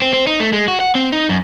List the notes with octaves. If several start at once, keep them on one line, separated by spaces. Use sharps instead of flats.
C4
C4
D#4
A3
G#3
F#4
F#5
C4
D#4
F#2